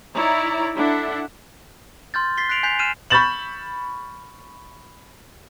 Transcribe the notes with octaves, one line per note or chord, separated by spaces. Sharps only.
D#4 E4 C#5 D5 A#5
D4 E4 A4 E5 F#5
C6 F6 G6 A6
A6 B6 C7 G7
F#6 B6 C7 D7 F7 F#7
G#5 F#6 G6 B6 C7 F7
F6 G6 C7 D#7 E7
B5 C#6 G6 A6 E7 F#7